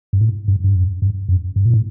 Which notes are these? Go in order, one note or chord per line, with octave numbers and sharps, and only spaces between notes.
G2
A2
G2
G2
F#2
G2
F#2
G2
A#2
A2